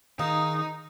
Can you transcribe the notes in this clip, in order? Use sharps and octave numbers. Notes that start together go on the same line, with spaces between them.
D#3 D#4 G#4 F5 D#6